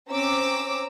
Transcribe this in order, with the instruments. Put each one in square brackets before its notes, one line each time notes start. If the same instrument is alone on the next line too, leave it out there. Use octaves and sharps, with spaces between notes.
[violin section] C4 C#4 A#5 D6 E6